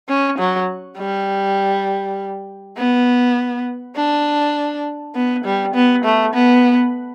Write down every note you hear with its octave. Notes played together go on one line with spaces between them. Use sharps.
C#4
F#3
G3
B3
D4
B3
G3
B3
A3
B3